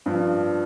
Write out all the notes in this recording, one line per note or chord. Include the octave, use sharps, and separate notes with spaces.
G2 F3